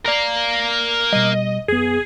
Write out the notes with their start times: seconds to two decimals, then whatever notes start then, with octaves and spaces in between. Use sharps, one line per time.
0.05 A#4 D5 F5 A#5
1.13 B2 G3 D#5
1.68 F#2 B3 G#4